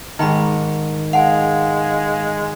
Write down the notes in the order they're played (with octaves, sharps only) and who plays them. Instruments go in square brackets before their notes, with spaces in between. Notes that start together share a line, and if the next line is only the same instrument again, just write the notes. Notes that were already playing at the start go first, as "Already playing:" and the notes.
[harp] G#2 D#3 [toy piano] D#4 G5 B5
[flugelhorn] G#3 [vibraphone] F5 [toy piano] F#5 G#5